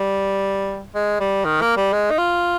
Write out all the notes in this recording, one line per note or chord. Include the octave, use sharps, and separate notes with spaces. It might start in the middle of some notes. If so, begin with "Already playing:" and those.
Already playing: G3
G#3
G3
D#3
A#3
G3
G#3
D#4
F4